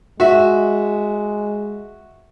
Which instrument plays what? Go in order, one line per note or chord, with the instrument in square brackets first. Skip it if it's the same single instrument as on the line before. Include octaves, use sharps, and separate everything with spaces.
[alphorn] G#3 [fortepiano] F#4 E5